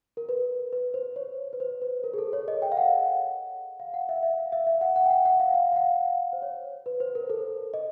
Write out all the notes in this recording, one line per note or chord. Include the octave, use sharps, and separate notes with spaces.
A#4
B4
B4
C5
C#5
B4
C5
B4
A#4
G#4
A4
C#5
D#5
G5
F5
F#5
F5
F#5
E5
E5
F5
E5
E5
F#5
F#5
G5
F#5
F#5
F5
F5
F5
F#5
C5
C#5
B4
C5
A#4
A4
D#5